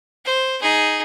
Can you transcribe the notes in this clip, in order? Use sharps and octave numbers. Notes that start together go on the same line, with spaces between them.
C5
D#4 G#4